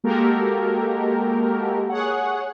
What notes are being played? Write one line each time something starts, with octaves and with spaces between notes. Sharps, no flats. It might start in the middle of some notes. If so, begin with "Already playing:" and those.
G#3 A#3 F#4 G4 A4 A#4
G#4 C#5 F#5